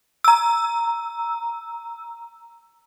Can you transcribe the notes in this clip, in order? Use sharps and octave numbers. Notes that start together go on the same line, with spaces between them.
A#5 E6